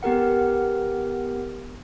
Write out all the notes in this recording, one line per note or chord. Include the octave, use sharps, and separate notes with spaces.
B3 G4 A#4 F#5